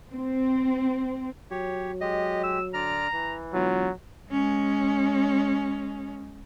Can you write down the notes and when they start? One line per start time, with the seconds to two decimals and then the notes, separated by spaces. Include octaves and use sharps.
0.12 C4
1.51 F#3 G4 C#5
2.01 G#3 G4 D#5
2.44 E6
2.74 D3 D5 A#5 F6
3.13 E3
3.54 E1 F#3 F4
4.31 G#3 C#4